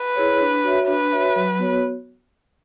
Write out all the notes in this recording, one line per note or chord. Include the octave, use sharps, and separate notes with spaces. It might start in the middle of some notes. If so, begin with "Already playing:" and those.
Already playing: B4
E4 G#4 C#5
D4
F#4 C#5 E5
D4 B4
F#4 C#5 E5
F#3
B3 F#4 C#5